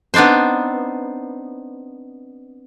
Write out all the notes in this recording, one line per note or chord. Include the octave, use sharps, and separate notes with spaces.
B3 C4 D4 D#4 C5